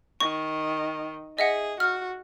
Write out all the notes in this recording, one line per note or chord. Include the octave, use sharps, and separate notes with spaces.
D#3 C#6
G#4 D#5 E5 F#5
F#4 F6